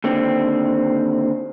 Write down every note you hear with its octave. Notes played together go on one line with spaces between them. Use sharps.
D#2 D3 C4